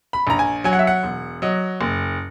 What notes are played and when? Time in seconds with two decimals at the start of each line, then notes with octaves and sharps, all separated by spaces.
0.13 B5
0.27 A#1 A#5
0.39 G#5
0.64 F#3 G#5
0.73 F#5
0.79 E5
0.87 F#5
1.03 E1
1.42 F#3 D#5
1.81 F#1